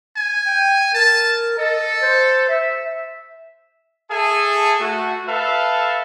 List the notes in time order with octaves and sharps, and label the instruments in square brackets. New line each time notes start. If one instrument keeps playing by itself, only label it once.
[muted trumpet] G#5
[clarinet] G5
[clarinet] A#4 [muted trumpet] A5
[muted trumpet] A4 [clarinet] D#5
[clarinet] C5
E5
[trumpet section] G#4 A4 E5 G#5 A5
A3 F#4
A4 B4 E5 F5 A5